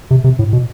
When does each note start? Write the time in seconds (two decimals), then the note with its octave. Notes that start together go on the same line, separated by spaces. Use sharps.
0.11 C3
0.24 C3
0.39 A2
0.53 B2